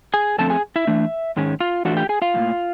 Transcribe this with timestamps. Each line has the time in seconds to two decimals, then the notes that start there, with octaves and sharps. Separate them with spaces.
0.14 G#4 G#5
0.38 F2 D3 F3 A3 C4 A4 A5
0.50 G#4 G#5
0.76 E4 E5
0.87 E3 A3 D4
1.36 G#2 D#3 G#3 C#4
1.60 F4 F5
1.85 A2 E3 A3 D4 F4 F#4 F#5
1.97 G4 G5
2.09 G#4 G#5
2.22 F4 F5
2.34 A2 F3 A#3